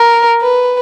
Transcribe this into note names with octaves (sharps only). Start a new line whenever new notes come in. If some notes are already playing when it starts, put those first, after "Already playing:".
Already playing: A#4
B4